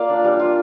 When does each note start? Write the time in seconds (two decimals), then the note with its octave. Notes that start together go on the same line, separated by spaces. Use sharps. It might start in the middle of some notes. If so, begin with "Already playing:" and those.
Already playing: A#3 F4 D5 F5
0.09 D4
0.24 G3
0.40 F4